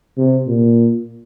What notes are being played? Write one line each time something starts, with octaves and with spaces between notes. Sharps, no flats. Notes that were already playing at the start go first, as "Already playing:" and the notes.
C3
A#2